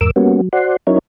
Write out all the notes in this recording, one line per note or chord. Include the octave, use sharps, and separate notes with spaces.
E2 G#2 A#4 D6 E6
G3 A#3 B3 C#4 F#4
F#3
F#4 C5 D5 F#5 C6
F#3 C#4 D#4 E4 A#4 C#5